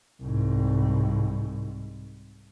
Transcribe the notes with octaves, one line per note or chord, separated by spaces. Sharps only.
C2 G#2